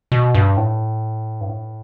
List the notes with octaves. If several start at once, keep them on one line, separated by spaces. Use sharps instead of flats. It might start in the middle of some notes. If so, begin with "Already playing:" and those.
B2
G2
A2
G2
A2